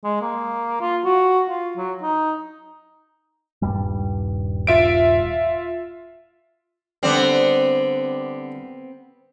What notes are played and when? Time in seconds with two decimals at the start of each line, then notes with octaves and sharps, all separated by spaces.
0.04 G#3
0.21 A#3
0.81 F4
1.05 F#4
1.49 F4
1.77 F#3
2.02 D#4
3.62 D#1 G2 G3
4.67 F4 E5 D7
7.03 D3 G3 B3 C4